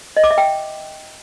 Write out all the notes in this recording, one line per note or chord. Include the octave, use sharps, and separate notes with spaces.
D#5
D6
E5
G5